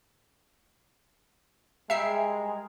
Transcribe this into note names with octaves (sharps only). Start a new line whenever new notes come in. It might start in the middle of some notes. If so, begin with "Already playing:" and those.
G3 G#3 G#4 A#4 E5 C7